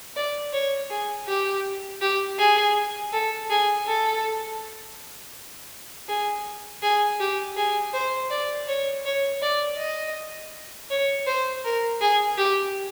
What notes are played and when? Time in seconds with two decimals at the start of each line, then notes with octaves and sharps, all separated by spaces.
0.16 D5
0.53 C#5
0.90 G#4
1.28 G4
2.01 G4
2.39 G#4
3.12 A4
3.50 G#4
3.87 A4
6.08 G#4
6.82 G#4
7.20 G4
7.57 G#4
7.93 C5
8.30 D5
8.68 C#5
9.05 C#5
9.42 D5
9.78 D#5
10.90 C#5
11.27 C5
11.64 A#4
12.01 G#4
12.38 G4